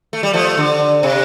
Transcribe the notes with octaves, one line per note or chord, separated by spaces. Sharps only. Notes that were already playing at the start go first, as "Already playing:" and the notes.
A3
G3
F3 A3
D3
C3